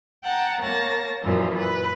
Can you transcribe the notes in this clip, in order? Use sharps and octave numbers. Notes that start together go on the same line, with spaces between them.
F#5 G5 A5 A#5
A#3 C#5 A5 A#6
F#2 A#2 E3 F3
B4